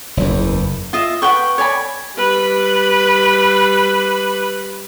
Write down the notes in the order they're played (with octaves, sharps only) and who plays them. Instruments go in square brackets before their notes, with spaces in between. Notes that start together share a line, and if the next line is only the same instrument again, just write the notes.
[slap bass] F#1 E2
[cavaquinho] F4 D#5 E5
B4 F#5 G5 C#6
C#5 D5 G#5 B5
[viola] G3 B4